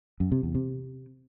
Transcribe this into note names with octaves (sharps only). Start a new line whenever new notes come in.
F#2
C3
E2
C3